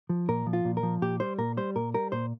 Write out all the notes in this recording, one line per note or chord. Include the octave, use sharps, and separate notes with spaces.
F3
A#2 A#4
F3
F4
A#2
A#4
F3
A#2 G4
G3 C5
A#2 A#4
G3 C5
A#2 A#4
G3 A#4
A#2 C5